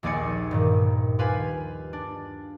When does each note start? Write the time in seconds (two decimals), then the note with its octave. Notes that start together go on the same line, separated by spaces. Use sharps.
0.03 A#1 D#2 G#4 D5 G#5 C#7
0.51 G2 A#2 D#3
1.19 F4 G4 B4 F5 G#5
1.93 D4